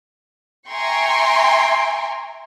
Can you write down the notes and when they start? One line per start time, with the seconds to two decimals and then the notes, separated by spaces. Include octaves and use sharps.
0.70 E5 G5 G#5 A#5 C6 C#6